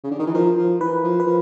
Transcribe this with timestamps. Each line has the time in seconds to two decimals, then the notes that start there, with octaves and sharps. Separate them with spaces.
0.04 C#3
0.11 D3
0.19 D#3
0.27 E3
0.34 F3 A#4
0.57 F3
0.81 E3 B4
1.04 F3
1.20 B4
1.27 F3